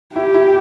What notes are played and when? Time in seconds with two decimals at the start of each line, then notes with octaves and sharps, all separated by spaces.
0.15 E4 G4
0.34 E4